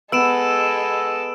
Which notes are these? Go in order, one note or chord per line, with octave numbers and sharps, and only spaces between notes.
G#3 B3 A4 E6 D7 E7